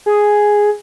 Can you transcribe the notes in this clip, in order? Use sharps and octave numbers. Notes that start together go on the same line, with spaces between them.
G#4